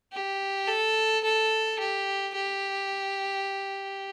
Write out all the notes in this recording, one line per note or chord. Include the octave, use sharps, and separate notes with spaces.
G4
A4
A4
G4
G4